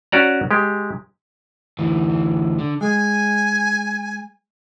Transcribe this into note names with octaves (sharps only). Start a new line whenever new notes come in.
C#4 F#4 D5 A#5
G#3 G4
D2 E3
D3
G#3 G#5